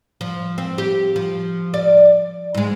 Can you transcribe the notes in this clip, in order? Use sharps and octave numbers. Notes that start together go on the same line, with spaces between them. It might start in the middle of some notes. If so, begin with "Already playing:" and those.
F3
C4
G4
F3
D5
G#2 G#3